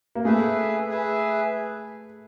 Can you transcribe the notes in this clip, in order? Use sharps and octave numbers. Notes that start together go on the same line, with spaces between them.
A#3
A3 G#4 B4 E5
G#4 B4 E5